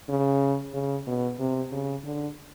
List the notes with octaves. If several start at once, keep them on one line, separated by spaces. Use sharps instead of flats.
C#3
C#3
B2
C3
C#3
D3